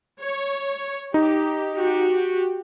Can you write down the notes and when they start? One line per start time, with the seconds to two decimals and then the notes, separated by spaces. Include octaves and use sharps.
0.20 C#5
1.14 D#4 G4
1.76 F#4 G4